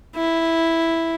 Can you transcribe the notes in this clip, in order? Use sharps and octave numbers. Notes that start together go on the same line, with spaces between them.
E4